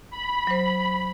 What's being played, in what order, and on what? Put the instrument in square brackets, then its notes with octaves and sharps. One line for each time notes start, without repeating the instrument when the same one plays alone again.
[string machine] B5
[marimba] F#3 C5